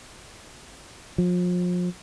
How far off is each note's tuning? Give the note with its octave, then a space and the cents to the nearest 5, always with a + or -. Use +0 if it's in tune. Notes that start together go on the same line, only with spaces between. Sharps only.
F3 +35